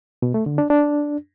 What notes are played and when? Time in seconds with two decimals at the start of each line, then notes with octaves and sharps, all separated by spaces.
0.22 B2
0.34 A3
0.46 D3
0.58 D4
0.70 D4